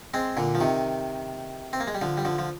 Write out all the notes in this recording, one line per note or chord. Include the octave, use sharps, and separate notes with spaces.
G#3 C4
A#2 D3
F3
C3 D#3
C4
A#3
G#3
G3
D3 F3
G3
D3 F3
F3